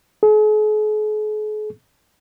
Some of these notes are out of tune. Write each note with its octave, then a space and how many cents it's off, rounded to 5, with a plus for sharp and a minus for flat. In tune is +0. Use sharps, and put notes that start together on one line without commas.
G#4 +45